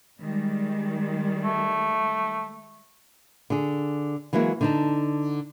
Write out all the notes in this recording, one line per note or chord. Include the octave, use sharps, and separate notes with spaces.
D#3 G3 G#3
A3
D3 G#4
E3 F#3 G#3 A#3 E4
D3 D#4 A5